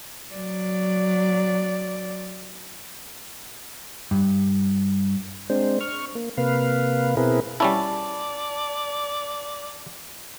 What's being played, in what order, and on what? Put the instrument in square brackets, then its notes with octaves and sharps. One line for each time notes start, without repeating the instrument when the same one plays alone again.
[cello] F#3 D5
[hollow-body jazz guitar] G2
[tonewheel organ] G#3 C4 D4 C5
C#6 F6
A#3
C3 A#3 B4 F5
B2 C4 E4 G#4 A#4 B4
[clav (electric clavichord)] G3 C#4 E4 [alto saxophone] D5 [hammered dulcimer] A5